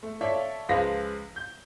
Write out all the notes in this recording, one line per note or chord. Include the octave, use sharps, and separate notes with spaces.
A3
F4 A4 C#5 D5 E5 F5
C#2 F3 G#3 F4 B4 A#6
G6